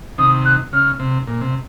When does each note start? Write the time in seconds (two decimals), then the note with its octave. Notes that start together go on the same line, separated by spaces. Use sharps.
0.18 C3 D#3 D#6
0.45 F#6
0.73 C#3 F6
1.00 C3
1.28 A#2
1.41 C3